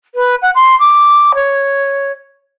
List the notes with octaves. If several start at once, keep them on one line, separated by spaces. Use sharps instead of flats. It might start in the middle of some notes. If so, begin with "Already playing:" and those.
B4
F#5
C6
D6
C#5